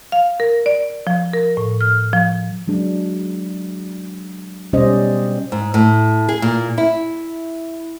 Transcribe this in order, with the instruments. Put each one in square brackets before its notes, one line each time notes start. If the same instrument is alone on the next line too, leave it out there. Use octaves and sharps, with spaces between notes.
[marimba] F5
A#4
D5
F3
A#4
A2
F6
F3
[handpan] F#3 G#3 D4
B2 G3 C#4 C5 D5 D#5
[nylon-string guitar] G#2
A2
G#4
A#2
E4